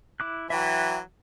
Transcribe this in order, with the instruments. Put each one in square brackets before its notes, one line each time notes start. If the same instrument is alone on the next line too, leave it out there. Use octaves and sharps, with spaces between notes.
[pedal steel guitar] E4 D6 F#6
[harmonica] E3 F#3 [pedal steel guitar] E5 G5